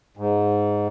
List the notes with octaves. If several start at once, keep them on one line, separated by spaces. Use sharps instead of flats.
G#2